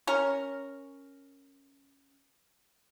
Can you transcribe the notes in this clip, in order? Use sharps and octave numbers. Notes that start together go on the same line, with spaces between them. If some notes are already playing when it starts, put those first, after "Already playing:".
C#4 A#4